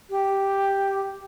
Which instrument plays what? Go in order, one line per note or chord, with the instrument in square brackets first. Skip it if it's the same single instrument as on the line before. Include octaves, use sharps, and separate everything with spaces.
[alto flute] G4